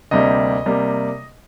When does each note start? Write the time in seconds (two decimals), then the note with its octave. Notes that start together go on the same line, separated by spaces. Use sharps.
0.11 D2 C3 G3 A#3 D#5
0.66 C3 G3 A#3